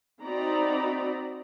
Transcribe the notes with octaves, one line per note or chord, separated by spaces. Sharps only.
C4 D#4 F#4 D5 A#5 B5